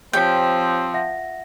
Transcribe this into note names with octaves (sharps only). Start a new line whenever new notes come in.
F3 C4 G4 C#5 G5 B6
E5 F#5 A#6